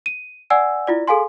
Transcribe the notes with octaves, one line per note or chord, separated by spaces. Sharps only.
D#7
D5 F#5 G#5 E6
E4 F4 D5
G#4 A4 F5 G#5 C6